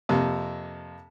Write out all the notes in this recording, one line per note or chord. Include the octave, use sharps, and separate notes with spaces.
F2 C3 A#3